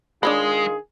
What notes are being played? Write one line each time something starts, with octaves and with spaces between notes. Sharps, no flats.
D#3 G#3 D4 F4 G#4 C#5 B5